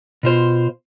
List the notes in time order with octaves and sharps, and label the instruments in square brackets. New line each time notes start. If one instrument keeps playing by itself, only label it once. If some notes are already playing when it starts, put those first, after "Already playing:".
[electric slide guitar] B2 F4 C5